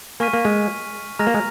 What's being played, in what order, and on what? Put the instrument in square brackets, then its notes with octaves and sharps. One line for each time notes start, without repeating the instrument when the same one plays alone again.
[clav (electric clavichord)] A#3 [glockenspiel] G#5 C#6 F6 B6 D#7
[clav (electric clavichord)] A#3
G#3
[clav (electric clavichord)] G#3 [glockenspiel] A#5 F6 A#6 F7
[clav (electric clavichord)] A#3
G#3